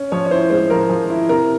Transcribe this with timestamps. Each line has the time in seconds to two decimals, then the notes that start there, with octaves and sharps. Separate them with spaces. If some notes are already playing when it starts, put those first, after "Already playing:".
Already playing: C#4
0.12 F3 C#5
0.26 C#5
0.30 E4 C5
0.50 G#3 C5
0.70 F3 A#4
0.89 F3
1.10 E4
1.29 C3 A#4